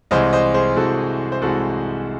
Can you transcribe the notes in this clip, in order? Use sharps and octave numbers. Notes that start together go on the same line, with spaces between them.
C2 C3 E3 G#3 C5 D#5
C5 D#5
G#4 C5
C2 C3 E3 G#3 F#4 A4
C5
C2 C3 E3 G#3 F#4 A4